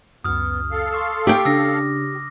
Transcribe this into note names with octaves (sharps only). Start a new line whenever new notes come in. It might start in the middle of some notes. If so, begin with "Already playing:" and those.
C#2 F#2 B3 D#6 F6
A4 F5
C6 C#6 E6
G4 G5 D6
C#3 D4 E6 A#6